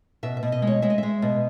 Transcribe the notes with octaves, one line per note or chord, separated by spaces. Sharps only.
B2 E5
E5
B2
D#5
G#3
C#5
G#3 E5
D#5
G#3 E5
B2